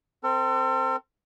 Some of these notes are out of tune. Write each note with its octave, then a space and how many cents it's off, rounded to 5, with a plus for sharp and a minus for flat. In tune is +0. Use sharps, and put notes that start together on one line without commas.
C4 -5 A4 +40